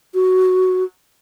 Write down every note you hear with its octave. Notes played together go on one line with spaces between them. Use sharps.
F#4